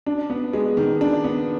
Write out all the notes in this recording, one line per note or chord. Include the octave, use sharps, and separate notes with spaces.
D4
B3
G#3
D#3
D4
B3